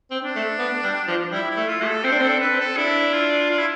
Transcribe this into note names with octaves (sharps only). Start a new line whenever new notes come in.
C4
D4
A3
B3
G3
F3
G3 E4
E4
A3
F4
A3
A4
C4 C5
D4
C4 A4
D4
B4
C4
A4
D4 E4
F4
F4
E4